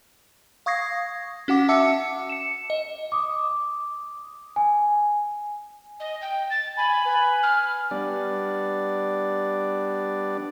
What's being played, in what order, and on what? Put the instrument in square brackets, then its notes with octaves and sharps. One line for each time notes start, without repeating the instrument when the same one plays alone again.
[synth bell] F5 C#6 D#6 G#6 A#6 C7
C#4 F#4 F#5 D6
E5 F#5 A5 D6 E6 C#7
C#7 E7
D#5
[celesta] D6 D#6
G#5
[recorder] D#5
G5
A6
[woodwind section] G#5 [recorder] B5
[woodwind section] B4 G#5
[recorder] F6
[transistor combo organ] G3 B3 D4 D5